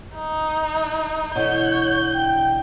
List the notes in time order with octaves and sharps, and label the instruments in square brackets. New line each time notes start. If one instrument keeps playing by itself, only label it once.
[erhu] D#4
[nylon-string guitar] B2 D3 E3 [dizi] C#5 [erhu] G6
[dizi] G5